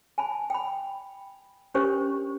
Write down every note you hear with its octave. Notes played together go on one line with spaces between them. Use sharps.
G#5 A5 B5
G5 B5
C#4 D4 G4 A#4 C5 C#6